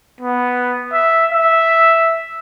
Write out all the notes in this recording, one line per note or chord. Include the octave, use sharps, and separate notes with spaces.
B3
E5
E5